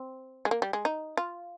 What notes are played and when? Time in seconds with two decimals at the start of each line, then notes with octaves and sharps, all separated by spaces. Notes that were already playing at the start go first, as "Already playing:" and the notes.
Already playing: C4
0.45 G#3
0.51 A#3
0.62 G3
0.73 G#3
0.85 D#4
1.17 F4